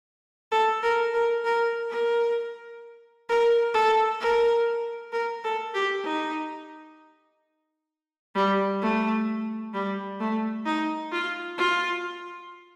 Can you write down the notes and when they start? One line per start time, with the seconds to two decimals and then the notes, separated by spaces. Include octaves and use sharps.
0.52 A4
0.83 A#4
1.14 A#4
1.45 A#4
1.90 A#4
3.29 A#4
3.74 A4
4.21 A#4
5.12 A#4
5.44 A4
5.74 G4
6.05 D#4
8.36 G3
8.82 A3
9.74 G3
10.20 A3
10.66 D#4
11.12 F4
11.58 F4